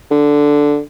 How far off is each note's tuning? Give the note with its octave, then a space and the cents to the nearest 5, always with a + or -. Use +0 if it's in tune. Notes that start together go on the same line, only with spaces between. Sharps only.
D3 -5